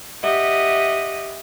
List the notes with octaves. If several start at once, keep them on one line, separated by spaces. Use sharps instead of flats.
G4 D#5 E5 F#5